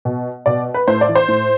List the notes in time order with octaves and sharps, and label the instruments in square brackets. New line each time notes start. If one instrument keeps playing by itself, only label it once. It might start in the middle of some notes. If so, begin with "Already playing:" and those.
[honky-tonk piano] B2
B2 D5
B4
A2 C5
D5
E3
C5
A2